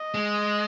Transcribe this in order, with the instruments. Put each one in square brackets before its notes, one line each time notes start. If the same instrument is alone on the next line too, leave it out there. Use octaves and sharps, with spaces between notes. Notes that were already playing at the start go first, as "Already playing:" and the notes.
Already playing: [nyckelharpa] D#5
[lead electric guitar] G#3